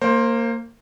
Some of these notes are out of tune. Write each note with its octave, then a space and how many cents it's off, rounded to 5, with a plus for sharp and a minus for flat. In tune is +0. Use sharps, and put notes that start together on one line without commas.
A#3 -15 C5 +15